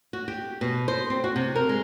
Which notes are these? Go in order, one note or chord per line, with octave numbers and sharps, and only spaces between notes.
F#4
G4
B2
C5
C4
F#4
C3
A#4
G#3